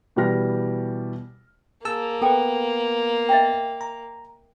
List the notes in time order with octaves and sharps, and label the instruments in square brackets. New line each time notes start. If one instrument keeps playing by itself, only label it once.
[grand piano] B2 E3 G3 G4 F6 A#6
[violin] A#3 [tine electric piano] G#4 A5 E6
[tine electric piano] B3 B4 [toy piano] A4 G5 G#5
[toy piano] D#5 E5 G5
[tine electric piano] A#5